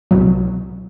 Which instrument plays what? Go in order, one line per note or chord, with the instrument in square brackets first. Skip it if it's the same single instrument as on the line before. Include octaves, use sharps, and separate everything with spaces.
[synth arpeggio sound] C2 B2 F#3